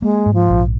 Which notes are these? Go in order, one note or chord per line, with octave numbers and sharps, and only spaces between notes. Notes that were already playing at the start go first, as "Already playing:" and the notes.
G#3 A#3
G#2
F3
A#1